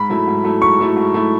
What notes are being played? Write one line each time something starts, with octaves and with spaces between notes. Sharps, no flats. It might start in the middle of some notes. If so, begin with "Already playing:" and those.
Already playing: G#2 B5
F#3 A3 E4
G#2
F#3 A3 E4
G#2 C#6
F#3 A3 E4
G#2
F#3 A3 E4